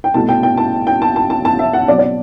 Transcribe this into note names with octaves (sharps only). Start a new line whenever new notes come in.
G5
C2 B2 A3 A5
G5
G5
A5
G5
A5
A5
A5
A5
E5
F#5
B2 F#3 C4 D5
D5